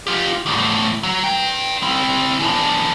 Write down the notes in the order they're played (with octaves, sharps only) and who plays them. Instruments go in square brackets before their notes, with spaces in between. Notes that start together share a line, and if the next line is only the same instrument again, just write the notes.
[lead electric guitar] F4 G4
E2 A2
F#3
B4 G5
C4 E4
E3 D4